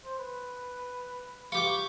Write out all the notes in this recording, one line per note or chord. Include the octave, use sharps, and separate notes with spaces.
C5
B4
F4 G4 B4 C#6 D6